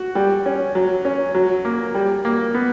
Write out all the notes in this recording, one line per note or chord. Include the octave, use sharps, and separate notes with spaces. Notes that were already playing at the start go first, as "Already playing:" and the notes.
Already playing: F#4
G3
C#4
F#3
C#4
F#3
A#3
G3
A#3
B3